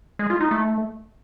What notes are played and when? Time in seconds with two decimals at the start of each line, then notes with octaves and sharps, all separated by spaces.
0.19 G#3
0.30 F4
0.41 D#4
0.51 A3